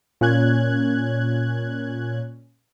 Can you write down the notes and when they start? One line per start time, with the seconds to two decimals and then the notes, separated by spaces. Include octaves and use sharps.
0.21 A#2 C#4 F#6 G#6